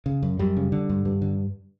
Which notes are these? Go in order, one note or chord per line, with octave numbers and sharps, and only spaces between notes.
C#3
F#2
F#2 G3
C#3
D3
G2
G2
D3